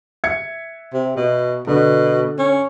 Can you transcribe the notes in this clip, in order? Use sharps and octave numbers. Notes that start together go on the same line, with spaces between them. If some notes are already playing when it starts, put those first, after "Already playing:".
E5 G#6 C#7
C3
B2
B2 D3
C#4